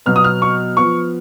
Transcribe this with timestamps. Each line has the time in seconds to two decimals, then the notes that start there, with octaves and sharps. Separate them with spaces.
0.06 B2 F#3 B3 F6
0.16 D#6
0.24 F6
0.42 C#6
0.77 F3 B3 C#6